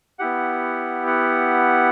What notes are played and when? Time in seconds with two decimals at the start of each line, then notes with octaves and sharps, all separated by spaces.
0.19 B3 E4 G4 F#5
1.07 F#5